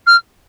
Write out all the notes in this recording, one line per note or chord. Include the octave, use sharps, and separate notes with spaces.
F6